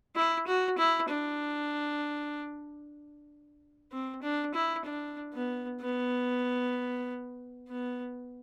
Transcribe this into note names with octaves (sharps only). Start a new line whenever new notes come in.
E4
F#4
E4
D4
C4
D4
E4
D4
B3
B3
B3